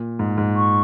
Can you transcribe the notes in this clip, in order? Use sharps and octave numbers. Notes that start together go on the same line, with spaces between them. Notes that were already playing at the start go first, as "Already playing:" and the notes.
Already playing: A#2
G#2
G#2
C#6